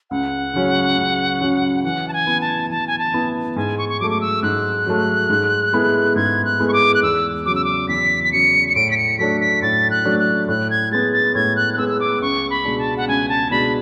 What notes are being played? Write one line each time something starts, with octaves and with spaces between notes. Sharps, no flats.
C#2 F#5
C#3 F#3 C#4
C#2
C#3 F#3 C#4
E3 F#5
A5
G#5
B3 E4
A5
E3 A5
G#5
A5
B3 E4
G#2 G#5
C#6
C#6
F#3 A3 D6
D6
E6
G#2 F#6
F#3 A3
G#2
G#3 B3 E4 A4
G#2 G#6
F#6
G#3 B3 E4 A4
C#6
D6
F#6
E2 E6
C#3 F#3 D6
E6
D6
E2 B6
B6
C#3 F#3 C#7
C#7
A2 D7
B6
C#7
F#3 A3 D4 B6
B6
A2 A6
F#6
F#3 A3 D4
F#6
A2 F#6
G#6
G#3 B3 A6
A6
A2 G#6
F#6
F#6
G#3 B3 E6
E6
D6
C#2 C#6
B5
B2 G#3 D4
A5
F#5
C#2 G#5
A5
B2 G#3 D4 B5